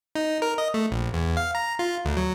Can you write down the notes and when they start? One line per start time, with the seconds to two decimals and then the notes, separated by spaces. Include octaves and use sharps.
0.15 D#4
0.42 A#4
0.58 D#5
0.74 A3
0.91 A#1
1.13 E2
1.37 F5
1.55 A#5
1.79 F4
2.05 D2
2.17 F#3